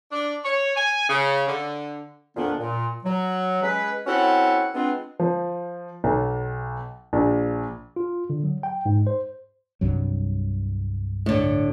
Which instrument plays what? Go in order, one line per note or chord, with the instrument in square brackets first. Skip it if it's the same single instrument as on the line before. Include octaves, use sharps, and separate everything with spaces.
[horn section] D4
C#5
G#5
C#3
D3
[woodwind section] F2 A#2 D#3 B3 D4
A#2
F#3
G#3 C#4 B4
C4 C#4 E4 F#4 A4 F#5
G#3 B3 C4 D4 F4
[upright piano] F3
B1
A#1
[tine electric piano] F4
D3
F#3
G5
G#2
C5
[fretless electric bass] C2 G2 F#3
[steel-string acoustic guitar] A2 D3